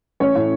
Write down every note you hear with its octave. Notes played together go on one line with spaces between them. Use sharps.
A1 C#4 C#5
A2